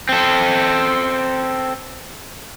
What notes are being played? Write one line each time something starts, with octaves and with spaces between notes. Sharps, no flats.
C4 A4